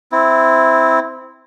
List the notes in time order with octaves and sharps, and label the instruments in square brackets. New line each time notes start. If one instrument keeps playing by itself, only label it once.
[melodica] C4 E4